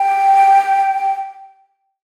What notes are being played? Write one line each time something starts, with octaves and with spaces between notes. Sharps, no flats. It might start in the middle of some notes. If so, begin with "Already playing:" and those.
Already playing: G5